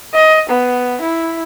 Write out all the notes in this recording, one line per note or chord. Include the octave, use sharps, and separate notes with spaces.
D#5
B3
E4